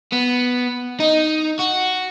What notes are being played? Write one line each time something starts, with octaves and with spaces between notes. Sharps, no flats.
B3
D#4
F#4